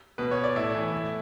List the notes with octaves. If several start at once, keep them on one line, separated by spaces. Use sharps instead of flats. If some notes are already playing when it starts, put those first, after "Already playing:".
B2 B4
C#5
D5
A2 E4
E3
A2